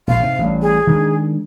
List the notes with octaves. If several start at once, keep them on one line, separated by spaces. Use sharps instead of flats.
A#1 F5
G#2 C3
A1 A2 G3
G#4
D#3 G#3 D4